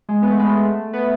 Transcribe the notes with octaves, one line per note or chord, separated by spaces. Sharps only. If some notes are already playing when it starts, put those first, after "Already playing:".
G#3
B3
A3
G#3
A3
B3